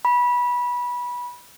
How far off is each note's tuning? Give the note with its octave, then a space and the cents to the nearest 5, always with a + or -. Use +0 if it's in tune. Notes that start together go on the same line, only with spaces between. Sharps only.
B5 -20